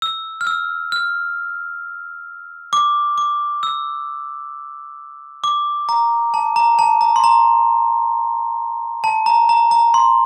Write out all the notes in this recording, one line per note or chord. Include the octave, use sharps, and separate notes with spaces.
E6
F6
E6
F6
D6
D6
E6
D6
A#5
A5
A#5
A5
A#5
C6
A#5
A5
A#5
A#5
A#5
C6